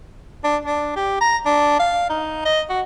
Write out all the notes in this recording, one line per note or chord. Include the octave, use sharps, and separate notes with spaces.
D4
D4
G4
A#5
D4
F5
D#4
D#5
F#4